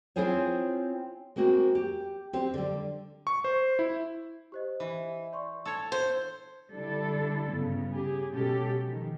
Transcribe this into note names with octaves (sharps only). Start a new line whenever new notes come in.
C4 E4 F4 G#4 C5 C#5
G#3 A#3 C4 F#4
G4
C4 G4 C5
D3 G3
C#6
C5
E4
G4 C5 D#5
E3
D5 C6 C#6
D4 A4 C#5 G#6 C#7
C5
D3 G3 D4 E4 A4
G2 C#3 B3
C#3 G4 G#4
B2 G#3 C#4 G4 A4
D#3 F3